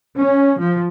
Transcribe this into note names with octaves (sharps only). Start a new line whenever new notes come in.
C#4
F3